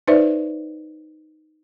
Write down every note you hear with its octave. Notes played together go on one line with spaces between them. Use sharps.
D#4 B4 C5 D5 E5